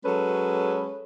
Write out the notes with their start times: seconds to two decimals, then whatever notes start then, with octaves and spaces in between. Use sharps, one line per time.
0.05 F#3 G#3 C#4 A4 B4